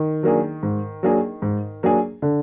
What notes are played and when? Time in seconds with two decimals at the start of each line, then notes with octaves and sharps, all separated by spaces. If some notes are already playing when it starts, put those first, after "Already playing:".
Already playing: D#3
0.23 F#3 A#3 D4 G#4
0.63 G#2
1.03 F#3 A#3 D4 G#4
1.42 G#2
1.83 F#3 A#3 D4 G#4
2.22 D3